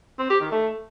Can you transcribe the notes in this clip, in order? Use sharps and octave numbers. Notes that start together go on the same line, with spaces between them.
C4
G4
D#3
A3